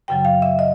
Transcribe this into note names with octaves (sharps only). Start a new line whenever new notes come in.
F#2 C#3 F#3 G5
F5
E5
D#5